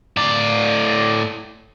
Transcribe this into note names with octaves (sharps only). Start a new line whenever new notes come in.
A2 D5